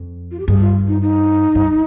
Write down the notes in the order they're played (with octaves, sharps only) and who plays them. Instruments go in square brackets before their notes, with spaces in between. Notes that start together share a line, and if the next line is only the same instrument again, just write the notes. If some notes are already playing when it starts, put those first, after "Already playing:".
Already playing: [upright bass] F2
[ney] F4
G4
[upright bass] G2 [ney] G#4
[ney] F4
D#4
D#4
[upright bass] G2